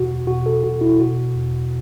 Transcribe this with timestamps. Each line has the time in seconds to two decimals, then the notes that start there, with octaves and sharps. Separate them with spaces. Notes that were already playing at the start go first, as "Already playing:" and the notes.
Already playing: E2 B2 F#4
0.27 B2 F#4
0.46 A4
0.63 B2 F#4
0.81 E4
0.99 B2 F#4
1.35 E2